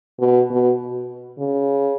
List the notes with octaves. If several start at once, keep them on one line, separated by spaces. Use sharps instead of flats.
B2
B2
C#3